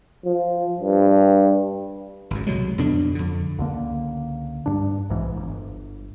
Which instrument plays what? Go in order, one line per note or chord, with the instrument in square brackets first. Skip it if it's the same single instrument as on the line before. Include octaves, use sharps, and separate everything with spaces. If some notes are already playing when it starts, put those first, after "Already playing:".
[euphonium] F3
G2
[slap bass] G#1 F#2
C2 B2 F#3 G#3
F2 B2 D3 D4
F2 D3
[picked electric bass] C#2 D3 A#3
G2 D4
B1 G#2 E3
D1 G1